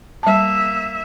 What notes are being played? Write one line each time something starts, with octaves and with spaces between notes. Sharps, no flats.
G3 A#3 E5 A5